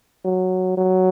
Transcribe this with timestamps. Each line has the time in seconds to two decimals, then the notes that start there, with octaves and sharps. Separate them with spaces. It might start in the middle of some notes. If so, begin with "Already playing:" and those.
0.25 F#3
0.77 F#3